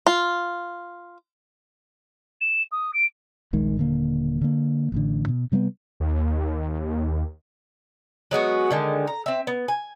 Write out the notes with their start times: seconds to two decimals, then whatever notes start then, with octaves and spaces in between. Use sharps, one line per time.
0.07 F4
2.41 E7
2.71 D#6
2.93 D7
3.53 D#1 A#1 D#3 G#3
3.77 D#1 D3 A#3
4.42 D3 A#3
4.92 A1 A2 D3
5.28 B2
5.52 C3 G3 A#3 B3
6.00 D#2
8.31 F#3 G#3 B3 F#4
8.71 D3 D#3 G#3
9.07 A#5
9.26 C4 E5
9.47 B3
9.68 G#5